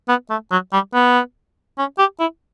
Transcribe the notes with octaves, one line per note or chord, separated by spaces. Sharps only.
B3
A3
F#3
G3
B3
C#4
G4
E4